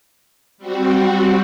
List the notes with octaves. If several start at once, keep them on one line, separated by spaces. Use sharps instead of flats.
G3 C4 F#4